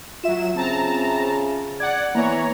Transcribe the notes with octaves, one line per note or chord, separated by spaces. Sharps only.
F#3 F4 E5 E7
C#3 C4 A5 A#5
D5 F#5 G#6
E3 A#3 B3 C#5 A#5